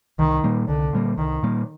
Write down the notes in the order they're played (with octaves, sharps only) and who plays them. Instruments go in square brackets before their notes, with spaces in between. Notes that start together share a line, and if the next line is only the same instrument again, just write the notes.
[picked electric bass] C2 [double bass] D#3
[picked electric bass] A#2 G3 A#3
[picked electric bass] C2 [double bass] D3
[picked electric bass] A#2 G3 A#3
[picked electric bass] C2 [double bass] D#3
[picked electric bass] A#2 G3 A#3